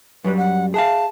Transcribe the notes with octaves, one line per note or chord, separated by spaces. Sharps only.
F#2 F#3 G3 B4
F#5
G#4 E5 F5 A5